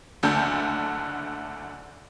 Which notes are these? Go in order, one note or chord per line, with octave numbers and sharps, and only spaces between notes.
F#1 D2 D3 A5 G6